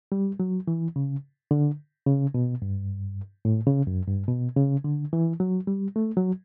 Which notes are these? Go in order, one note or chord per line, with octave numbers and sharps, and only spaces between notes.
G3
F#3
E3
C#3
D3
C#3
B2
G2
A2
C#3
F#2
G2
B2
C#3
D3
E3
F#3
G3
A3
F#3